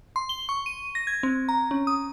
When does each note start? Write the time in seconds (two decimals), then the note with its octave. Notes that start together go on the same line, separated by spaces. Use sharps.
0.16 C6
0.29 G7
0.49 C#6
0.66 D#7
0.95 A#6
1.07 G#6
1.23 C4
1.49 A#5
1.71 C#4
1.87 D#6